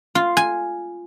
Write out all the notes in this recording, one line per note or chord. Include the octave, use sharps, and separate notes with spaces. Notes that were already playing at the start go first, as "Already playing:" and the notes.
F4
G#5